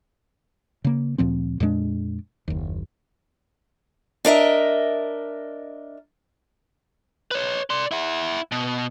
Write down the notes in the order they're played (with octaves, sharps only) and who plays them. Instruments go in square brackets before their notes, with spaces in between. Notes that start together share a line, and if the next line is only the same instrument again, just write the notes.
[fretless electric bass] C#3 A#3
D2 A#2 F3 C4
F2 A#2 G#3 D4
F#1 D#2
[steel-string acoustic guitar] D4 A#4 D#5 E5
[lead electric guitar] B4 C#5
D5 C6
E4 F#5
B2